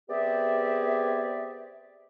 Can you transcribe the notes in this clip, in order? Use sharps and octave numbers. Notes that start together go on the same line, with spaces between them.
B3 C4 G4 G#4 D5 E5